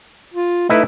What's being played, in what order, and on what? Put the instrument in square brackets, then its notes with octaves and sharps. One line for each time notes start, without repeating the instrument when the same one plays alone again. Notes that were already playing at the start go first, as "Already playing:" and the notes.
[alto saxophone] F4
[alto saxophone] A3 [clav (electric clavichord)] D#4 E4 B4